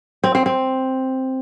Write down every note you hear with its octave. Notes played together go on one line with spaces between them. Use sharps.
C4
C4
C4